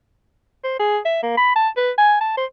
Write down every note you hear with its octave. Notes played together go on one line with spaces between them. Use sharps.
C5
G#4
E5
A#3
B5
A5
B4
G#5
A5
C5